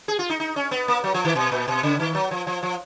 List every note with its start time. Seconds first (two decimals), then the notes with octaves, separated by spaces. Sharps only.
0.08 G#4
0.19 F4
0.30 D#4
0.40 D#4
0.56 C#4
0.71 B3
0.88 A#3
1.04 F#3
1.14 F3
1.25 D#3
1.35 B2
1.52 A#2
1.68 B2
1.83 C#3
1.99 D#3
2.15 F#3
2.31 F3
2.47 F3
2.63 F3